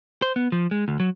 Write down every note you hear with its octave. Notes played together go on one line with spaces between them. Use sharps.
C5
B3
F3
G#3
D2
F#3